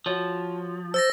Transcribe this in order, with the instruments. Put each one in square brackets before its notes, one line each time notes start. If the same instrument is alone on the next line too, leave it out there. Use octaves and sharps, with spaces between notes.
[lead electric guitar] F3 [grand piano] F#4 C#5
[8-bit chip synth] C5 [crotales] E6 A6 A#6